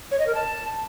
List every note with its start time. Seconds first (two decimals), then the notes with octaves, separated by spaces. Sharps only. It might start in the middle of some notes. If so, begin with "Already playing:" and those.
0.11 C#5
0.19 D#5
0.27 A#4
0.35 A5